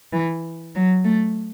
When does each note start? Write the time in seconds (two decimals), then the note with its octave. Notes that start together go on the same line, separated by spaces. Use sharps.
0.13 E3
0.75 F#3
1.04 A3